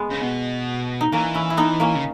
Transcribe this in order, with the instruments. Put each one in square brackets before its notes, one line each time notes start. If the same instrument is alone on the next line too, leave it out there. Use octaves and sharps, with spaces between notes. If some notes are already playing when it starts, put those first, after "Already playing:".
Already playing: [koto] G#3 B3
[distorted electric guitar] C#3
B2
[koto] D#4
[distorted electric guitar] E3 [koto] A#3 C#4
[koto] C#4 E4
E4
B3 D#4
A#3 C#4
[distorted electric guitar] C#3